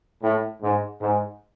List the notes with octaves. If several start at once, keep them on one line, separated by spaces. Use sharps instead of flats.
A2
G#2
G#2